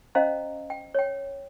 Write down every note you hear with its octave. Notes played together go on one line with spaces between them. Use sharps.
C#4 C5 D#5 F5 A#5
G5
C#5 G5